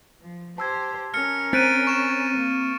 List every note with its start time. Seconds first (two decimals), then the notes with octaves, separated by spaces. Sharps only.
0.21 F3
0.58 G4 C5 A5 E6 G#6
1.14 C#4 A#4 F6 C#7
1.53 C4 A#5 F#6 A6 B6 D7 D#7
1.87 C#6 E7
2.36 A#3